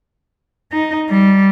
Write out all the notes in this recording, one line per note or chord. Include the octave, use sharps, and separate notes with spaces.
D#4
G3